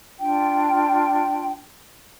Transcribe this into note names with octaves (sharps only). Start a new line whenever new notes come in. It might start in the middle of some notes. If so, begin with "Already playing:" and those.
D4 F4 G5